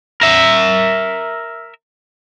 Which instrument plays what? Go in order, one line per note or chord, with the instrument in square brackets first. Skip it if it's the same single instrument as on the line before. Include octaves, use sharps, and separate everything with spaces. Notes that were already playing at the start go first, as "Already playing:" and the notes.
[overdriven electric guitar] A#4 E5